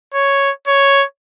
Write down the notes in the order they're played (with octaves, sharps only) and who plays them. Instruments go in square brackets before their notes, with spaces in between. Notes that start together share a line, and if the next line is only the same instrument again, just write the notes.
[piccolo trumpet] C#5
C#5